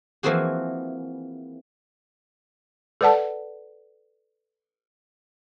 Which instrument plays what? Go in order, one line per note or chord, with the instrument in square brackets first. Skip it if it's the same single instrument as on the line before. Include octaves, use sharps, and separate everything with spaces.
[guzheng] E3 F3 A#3 C4 F#4 G#4
[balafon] A4 B4 D5 F#5 A5